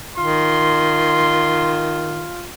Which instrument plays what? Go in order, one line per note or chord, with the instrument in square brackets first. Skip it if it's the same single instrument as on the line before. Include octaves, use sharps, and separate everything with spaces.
[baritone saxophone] D#3 [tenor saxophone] F4 [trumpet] C6